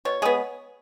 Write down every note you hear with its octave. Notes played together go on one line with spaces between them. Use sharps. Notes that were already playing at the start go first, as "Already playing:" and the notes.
B2 C#5
G#3 B3 G#4